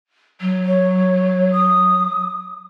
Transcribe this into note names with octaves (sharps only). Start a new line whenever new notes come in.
F#3
C#5
D#6